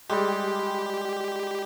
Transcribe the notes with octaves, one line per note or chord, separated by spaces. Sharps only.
G3 G#3 G4